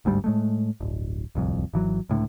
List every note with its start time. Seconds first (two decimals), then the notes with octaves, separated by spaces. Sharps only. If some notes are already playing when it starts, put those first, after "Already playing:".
0.05 G1 D2 G#2 G3
0.24 A2 G#3 A3
0.81 D1 G1
1.35 D1 C2 F2
1.74 G#1 E3 F#3
2.10 C#2 A2 D3